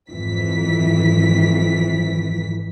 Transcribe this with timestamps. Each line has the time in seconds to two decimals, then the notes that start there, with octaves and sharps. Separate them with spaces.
0.10 G#1 F2 E3 B6